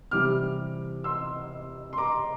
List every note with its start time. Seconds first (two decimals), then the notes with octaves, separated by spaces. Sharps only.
0.11 C3 E3 G3 D6 F6
1.04 C6 E6
1.93 C6
1.98 A#5 D6